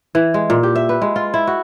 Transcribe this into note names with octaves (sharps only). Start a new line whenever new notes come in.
E3
G#3
A#2
G4
E5
B4
G#3
F4
E4
F#4